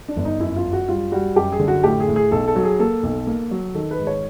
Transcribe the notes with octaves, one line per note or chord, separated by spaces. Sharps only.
D4
G1
D#4
F#2 E4
F4
F#2
F#4
G3 F4
G3 F#4
F#2 G4
G#4
D3
F#4
A2 G4
G#4
A2
G#4
B1 A4
A4
F#3
G#4
A#3 A4
B1
A#3
F#3
D#3 A4
B4
G#2
C#5